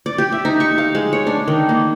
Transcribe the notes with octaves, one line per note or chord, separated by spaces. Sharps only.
D5
G4
E5
D#4
C#6
F5
G#3
C#5
D4
D#3
A#3